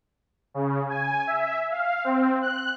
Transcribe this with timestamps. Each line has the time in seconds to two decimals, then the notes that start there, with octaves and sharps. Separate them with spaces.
0.54 C#3
0.89 G#5
1.27 E5
1.71 F5
2.04 C4
2.42 F#6